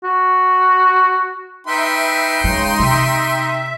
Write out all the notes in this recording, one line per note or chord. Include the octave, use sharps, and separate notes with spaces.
F#4
D#4 B4 E5 G5 C6
C#3 G#3
C3 E5